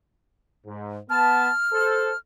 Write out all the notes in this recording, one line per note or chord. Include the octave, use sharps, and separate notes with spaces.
G#2
B3 A5 F6
A4 C5